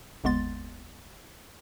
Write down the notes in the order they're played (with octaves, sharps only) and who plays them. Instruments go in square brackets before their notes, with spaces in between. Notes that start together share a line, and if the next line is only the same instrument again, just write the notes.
[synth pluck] G1 D#2 G#3 B3 C6 A6